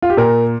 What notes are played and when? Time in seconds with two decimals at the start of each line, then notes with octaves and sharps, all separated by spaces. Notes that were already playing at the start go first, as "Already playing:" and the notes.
0.02 F4
0.10 G4
0.17 A#2 A#4